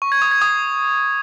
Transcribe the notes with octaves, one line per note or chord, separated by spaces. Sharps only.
C#6
G#6
D#6
G#6
D#6